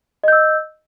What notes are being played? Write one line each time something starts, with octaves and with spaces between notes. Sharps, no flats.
D#5 E6 G6